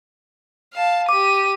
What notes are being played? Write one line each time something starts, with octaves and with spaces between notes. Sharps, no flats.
F5 A5
G4 D6 D#7